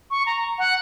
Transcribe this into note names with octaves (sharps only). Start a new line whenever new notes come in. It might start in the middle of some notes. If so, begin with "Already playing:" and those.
C#6
A#5
F#5